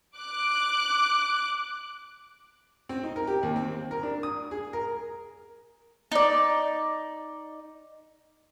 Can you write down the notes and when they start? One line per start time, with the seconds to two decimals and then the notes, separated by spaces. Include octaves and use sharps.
0.17 D6 F#6
2.89 C4
3.03 D#4
3.16 A#4
3.27 G4
3.43 D#2
3.56 C4
3.91 A#4
4.03 D4
4.23 D#6
4.51 G#4
4.73 A#4
6.12 D#4 D5